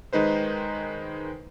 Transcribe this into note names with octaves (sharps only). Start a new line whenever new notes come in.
D#3 G#3 D#4 B4 C5